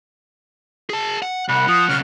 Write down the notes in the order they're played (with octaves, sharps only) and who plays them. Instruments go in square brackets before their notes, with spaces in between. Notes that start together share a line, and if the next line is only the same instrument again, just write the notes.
[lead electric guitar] G#4 A5
F#5
[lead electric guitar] C2 [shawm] F#5 [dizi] B5
[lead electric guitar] F3 [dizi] D#6
[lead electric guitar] B1 C#3 [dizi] F6